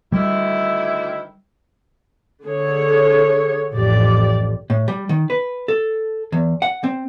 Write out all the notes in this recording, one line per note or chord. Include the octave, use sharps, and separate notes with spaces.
D2 D#3 G3 E4
D3 G#4 C#5
A1 F2 G4 D5
A2
G3
D#3
B4
A4
E2
F#5
C4